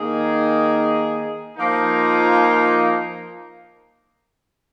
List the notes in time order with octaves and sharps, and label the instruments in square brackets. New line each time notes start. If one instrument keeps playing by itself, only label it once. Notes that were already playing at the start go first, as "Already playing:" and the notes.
Already playing: [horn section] D#3 A#3 D#4 G#4
F3 A#3 D#4